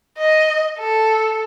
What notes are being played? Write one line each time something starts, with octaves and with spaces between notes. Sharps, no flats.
D#5
A4